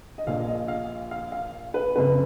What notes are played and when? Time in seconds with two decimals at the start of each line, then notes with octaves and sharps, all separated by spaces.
0.18 D#5
0.27 A#1 A#2 F3 F5
0.48 D#5
0.68 F5
1.11 F5
1.32 F5
1.74 B4
1.96 F#1 F2 C#3 B4